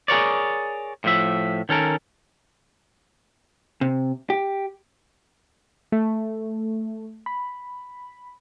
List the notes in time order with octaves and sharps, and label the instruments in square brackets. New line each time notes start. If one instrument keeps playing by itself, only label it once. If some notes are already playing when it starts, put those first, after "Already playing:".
[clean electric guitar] G#4 A#4 C#5 D5
A2 F3 E5
D#3 C#4 A4 A#4
[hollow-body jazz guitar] C3
G4
[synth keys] A3
B5